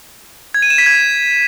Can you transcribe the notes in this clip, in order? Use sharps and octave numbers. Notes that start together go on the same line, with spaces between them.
G#6
D#7
E7
B6
G#6